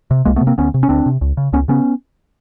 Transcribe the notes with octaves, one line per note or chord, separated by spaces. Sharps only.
C3
C2 G#3 A#3
A3 B3
C3
A#3 C4
D2 B3 C#4
C3
C#4
D2 C4 D4
C3
C#2
C#3
C#2 B3 C#4
C#3 B3 C#4